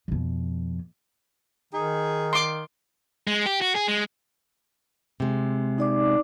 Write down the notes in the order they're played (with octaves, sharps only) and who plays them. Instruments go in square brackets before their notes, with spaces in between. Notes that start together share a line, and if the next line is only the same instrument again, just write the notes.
[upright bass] F2 B2
[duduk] D#3 [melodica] D#4 [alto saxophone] G#4
[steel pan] C6 D6
[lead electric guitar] G#3
G4
F#4
G#4
G#3
[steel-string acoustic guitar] C3 G#3
[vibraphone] D#4 D5 D6